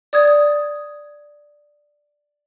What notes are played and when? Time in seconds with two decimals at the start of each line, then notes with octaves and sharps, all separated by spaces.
0.13 D5 D#6 G#6